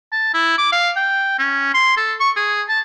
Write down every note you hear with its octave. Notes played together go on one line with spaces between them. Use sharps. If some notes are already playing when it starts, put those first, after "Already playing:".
A5
E4
D6
F5
G5
C#4
C6
A4
C#6
G#4
A5